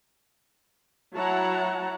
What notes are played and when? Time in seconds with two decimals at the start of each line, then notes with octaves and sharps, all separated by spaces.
1.14 F#3 E4 C#5 F#5 A5 A#5